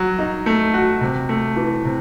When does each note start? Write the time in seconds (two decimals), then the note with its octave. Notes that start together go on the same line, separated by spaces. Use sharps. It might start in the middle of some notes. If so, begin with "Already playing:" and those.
Already playing: F#3
0.19 D#4
0.46 A3
0.74 F#4
1.01 C3
1.29 A3
1.56 E3
1.85 C3